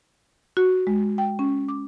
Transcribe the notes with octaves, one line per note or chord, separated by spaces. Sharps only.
F#4
G#3
G5
C#4
D6